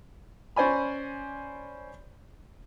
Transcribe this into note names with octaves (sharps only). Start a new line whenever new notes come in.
C#4 C5 D5 G#5 B5